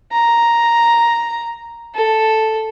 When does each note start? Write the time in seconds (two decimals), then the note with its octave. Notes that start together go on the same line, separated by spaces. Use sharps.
0.12 A#5
1.95 A4